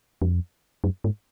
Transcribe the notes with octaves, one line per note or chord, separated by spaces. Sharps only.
F2
F#2
G#2